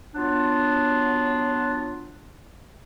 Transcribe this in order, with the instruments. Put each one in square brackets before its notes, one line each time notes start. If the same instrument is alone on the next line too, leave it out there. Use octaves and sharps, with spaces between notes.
[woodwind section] F#3 B3 D4 F4